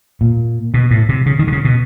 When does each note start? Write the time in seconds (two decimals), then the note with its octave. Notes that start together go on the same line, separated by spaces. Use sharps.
0.21 A#2
0.74 B2
0.91 A2
1.09 C3
1.26 C#3
1.39 D#3
1.47 D3
1.52 C#3
1.65 B2